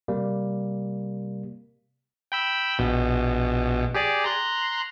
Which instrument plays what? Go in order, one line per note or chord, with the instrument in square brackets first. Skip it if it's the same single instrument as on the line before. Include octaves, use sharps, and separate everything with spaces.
[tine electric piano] C3 G3 A#3
[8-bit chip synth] G5 B5 E6
A#1 B2
G4 G#4 D5
A#5 C6 F#6